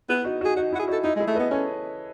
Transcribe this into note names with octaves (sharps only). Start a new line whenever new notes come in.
B3 E4 G#4
D#4 F#4
D#4 F#4
G#4
D#4 F#4
E4
F#4
G#4
D#4 F#4
A4
D#4 E4
G#3 E4 G#4
A3
B4 D#5
B3
C#4 A4 C#5